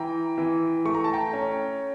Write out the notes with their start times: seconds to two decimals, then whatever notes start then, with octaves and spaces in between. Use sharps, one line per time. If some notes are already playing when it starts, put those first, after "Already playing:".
Already playing: E3 G5 A#5
0.38 E3
0.85 A3 C#6
0.95 A#5
1.04 A5
1.13 G5 A#5
1.33 C#4